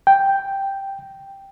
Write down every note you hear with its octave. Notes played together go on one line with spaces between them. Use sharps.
G5